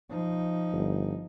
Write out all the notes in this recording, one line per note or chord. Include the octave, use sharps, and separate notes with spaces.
F3 D#4
G1